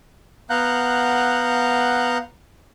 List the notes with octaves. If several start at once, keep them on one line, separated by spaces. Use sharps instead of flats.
B3 F5 F#5 A#5 F#6 G6